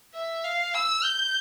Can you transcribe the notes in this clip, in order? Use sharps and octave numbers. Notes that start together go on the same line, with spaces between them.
E5
F5
E6
G6